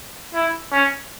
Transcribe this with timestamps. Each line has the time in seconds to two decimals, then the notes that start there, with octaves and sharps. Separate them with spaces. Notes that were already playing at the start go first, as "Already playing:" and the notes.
0.34 E4
0.72 C#4